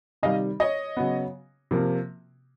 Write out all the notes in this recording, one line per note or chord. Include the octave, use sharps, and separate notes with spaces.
C3 D#3 G3 D#5 F5
C#5 D#5
C#3 F#3 B3
C3 F3 A#3